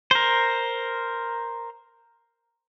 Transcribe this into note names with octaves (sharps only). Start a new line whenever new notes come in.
A#4 C5